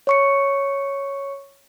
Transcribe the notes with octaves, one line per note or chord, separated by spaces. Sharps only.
C#5 C#6 C#7